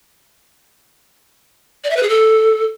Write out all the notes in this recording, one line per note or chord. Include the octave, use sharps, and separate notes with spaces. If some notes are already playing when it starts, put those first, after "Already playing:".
D5
E5
B4
G#4
A4